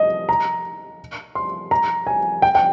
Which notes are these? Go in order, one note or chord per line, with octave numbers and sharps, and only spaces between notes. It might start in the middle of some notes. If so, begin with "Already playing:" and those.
Already playing: D#5
A#5
C6
A#5
G#5
G5
G5